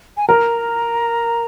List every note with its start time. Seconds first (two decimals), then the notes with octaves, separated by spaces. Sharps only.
0.17 G#5
0.28 A#4 A#5